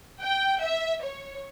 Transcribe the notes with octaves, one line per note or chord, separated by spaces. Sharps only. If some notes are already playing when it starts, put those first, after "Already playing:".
G5
E5
C#5